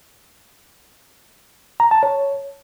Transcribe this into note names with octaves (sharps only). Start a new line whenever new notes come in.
A#5
A5
C#5